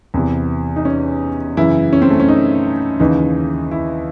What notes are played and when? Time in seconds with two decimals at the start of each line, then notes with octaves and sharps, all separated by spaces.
0.14 E2 C3 E3
0.76 D#4
0.85 C#4
1.57 F#2 C#3 E3 E4
1.93 C#4
2.02 C4
2.11 A3
2.20 C#4
2.28 D#4
3.00 D#2 C#3 E3 D#4
3.71 E4